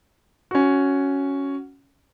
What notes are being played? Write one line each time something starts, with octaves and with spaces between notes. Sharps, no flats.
C#4 F#4